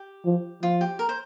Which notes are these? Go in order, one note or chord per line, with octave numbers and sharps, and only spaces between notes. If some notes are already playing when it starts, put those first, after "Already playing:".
Already playing: G4
F3
F3 F4
G4
A#4
C5